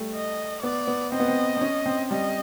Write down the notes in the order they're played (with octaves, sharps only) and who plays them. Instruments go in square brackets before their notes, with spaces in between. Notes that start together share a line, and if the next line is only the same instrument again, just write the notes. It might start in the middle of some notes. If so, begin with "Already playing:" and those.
Already playing: [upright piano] G3 A3
[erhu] D#5
[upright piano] B3 [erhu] D5
[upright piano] B3
[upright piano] C4 [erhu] D#5
[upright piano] B3
C4
C4
C#4
C4
[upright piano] G3 [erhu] D#5